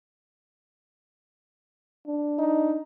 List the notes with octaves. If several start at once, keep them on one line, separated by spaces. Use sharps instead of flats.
D4
D#4